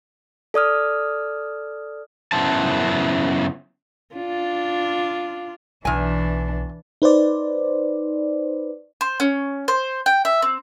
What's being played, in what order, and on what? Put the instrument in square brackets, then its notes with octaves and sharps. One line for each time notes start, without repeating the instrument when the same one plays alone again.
[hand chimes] A4 D5 D#6 F6
[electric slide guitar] F#2 C#3 B3 E4 C5 A5
[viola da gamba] D4 F4
[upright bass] B1 [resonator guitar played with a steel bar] E2 G#5 [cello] E3 D4
[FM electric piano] D#4 B4 C5 D5
[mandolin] C5
C#4
C5
G5
E5
C4